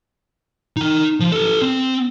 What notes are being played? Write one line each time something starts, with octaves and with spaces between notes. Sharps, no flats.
D#4 G5
F3
A4 B4
C4